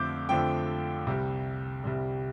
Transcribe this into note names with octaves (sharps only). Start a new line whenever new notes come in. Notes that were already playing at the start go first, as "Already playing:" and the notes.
Already playing: F2 D3 F3 A3 C4 D6 G6
F2 D3 F3 A3 C4 G5
C2 C3 G3
C2 C3 G3